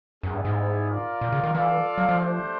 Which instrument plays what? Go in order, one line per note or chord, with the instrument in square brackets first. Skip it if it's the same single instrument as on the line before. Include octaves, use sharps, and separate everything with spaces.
[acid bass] F#2 [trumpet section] G3 B3 E4 G#4
[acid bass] G2
G#2
[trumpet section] F4 A#4 D5 F5
[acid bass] A#2
C#3
D#3
[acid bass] E3 [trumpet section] F4 A4 D5 F5
[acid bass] F#3
F3
[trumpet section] A3 D4 G4 C5